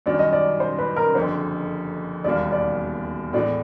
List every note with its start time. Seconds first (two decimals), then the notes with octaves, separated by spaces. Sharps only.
0.06 F#2 D#3 G3 D5
0.19 D#5
0.33 D5
0.60 C5
0.78 B4
0.96 A#4
1.15 F#1 F2 D3 C5
2.24 E1 D#2 D#3 G3 A#3 D5
2.52 D5
3.33 A2 E3 G#3 B3 D5